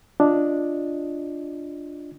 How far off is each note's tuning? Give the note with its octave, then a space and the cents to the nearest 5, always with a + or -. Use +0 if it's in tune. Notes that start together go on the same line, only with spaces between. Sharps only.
D4 +0 F4 +0 D#5 +0